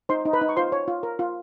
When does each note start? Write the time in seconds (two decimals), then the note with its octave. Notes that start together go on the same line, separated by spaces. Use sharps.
0.09 D#4 C5 C6
0.25 D#4
0.33 B4 B5
0.42 D#4
0.49 C#6
0.57 F4 C5 C6
0.72 C#5
0.88 F4
1.03 A#4
1.19 F4